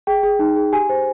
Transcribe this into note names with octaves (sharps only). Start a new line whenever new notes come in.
G#4 G5
G#4
D#4
G#4
G4 G#5
C5